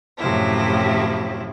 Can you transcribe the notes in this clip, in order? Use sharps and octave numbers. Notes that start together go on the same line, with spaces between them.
F#2 A2 C3 F3 F#3 E4